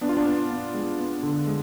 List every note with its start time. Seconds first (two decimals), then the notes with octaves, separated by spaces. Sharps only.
0.01 B3 D4
0.09 F4
0.17 D4
0.25 B3
0.50 B3
0.74 G#3
0.98 B3
1.23 D3
1.47 G#3